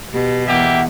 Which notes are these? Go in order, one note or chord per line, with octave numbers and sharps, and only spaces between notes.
B2 G4
E2 A#3 G4 E5 F#5